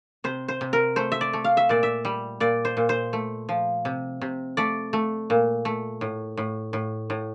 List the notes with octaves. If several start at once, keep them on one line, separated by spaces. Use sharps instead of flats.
C3 C5
C5
C3
A#4
A3 C5
E5
D5
A3
F5
E5
A#2 D5
E5
G3
A#2 D5
C5
A#2
C5
A3
F3
C3
C3
A3 D5
A3
A#2
A3
A2
A2
A2
A2